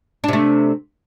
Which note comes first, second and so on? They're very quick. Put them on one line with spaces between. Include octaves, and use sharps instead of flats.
D4 C3 A3